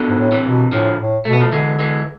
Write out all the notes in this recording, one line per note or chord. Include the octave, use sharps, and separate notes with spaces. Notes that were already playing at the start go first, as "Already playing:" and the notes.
Already playing: B2 D3
G#2
A2
C3 E3
B2
A2 D3 F3
A2
B2 A3
B3
F3 A3
D3 E3 G#3
E3 G#3